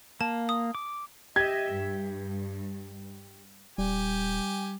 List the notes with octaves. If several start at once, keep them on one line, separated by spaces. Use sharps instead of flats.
A#3 A5
D#6
D6
G4 D#5 E5 G#6
G2
D#1 G3 G4 G#5